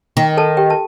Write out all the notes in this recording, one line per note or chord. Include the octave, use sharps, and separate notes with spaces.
D#3
A4 A5
G4 G5
A5